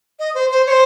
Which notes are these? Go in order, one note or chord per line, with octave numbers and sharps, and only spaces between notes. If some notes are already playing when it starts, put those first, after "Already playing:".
D#5
C5
C5
C#5
C5